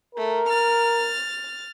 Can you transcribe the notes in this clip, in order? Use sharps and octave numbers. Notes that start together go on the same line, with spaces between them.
A3 A#4
F6 A6